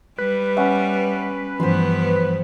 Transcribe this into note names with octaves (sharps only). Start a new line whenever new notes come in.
G3 B4
B3 C#4 E5 F#5
G2 E3 F3 B3 C5 C6